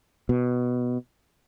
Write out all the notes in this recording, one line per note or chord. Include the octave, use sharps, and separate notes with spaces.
B2